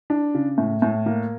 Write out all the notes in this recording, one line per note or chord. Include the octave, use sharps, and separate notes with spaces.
D4
C#3
A2
A2
A#3